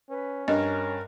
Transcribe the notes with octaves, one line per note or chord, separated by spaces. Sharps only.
C#4 B4
G2 A#4 D#5